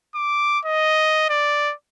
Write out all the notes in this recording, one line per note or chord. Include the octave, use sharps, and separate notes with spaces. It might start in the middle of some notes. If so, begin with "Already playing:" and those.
D6
D#5
D5